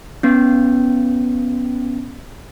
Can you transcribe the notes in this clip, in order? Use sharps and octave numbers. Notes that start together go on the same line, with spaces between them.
B3 C#4